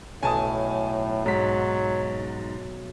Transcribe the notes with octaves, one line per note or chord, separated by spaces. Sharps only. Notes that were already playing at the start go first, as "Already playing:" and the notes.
B1 A2 G#5 A5 D#6
G#2 F#3 B6